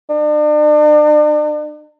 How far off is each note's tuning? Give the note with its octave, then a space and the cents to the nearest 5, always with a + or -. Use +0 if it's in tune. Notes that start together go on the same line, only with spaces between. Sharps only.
D4 +40